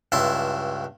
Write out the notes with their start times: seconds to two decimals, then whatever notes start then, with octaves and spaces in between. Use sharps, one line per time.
0.12 C#2 G2 E4 A5 C6